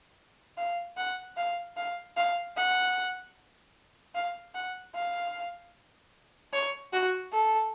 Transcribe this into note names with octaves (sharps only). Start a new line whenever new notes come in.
F5
F#5
F5
F5
F5
F#5
F5
F#5
F5
C#5
F#4
A4